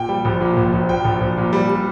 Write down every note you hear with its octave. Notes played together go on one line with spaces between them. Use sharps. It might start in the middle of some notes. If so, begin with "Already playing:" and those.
Already playing: A#2 G5
G3
A#1
A#2
A#1
A#1
A#1 G5
A#1
A#1
A#2
G3
G3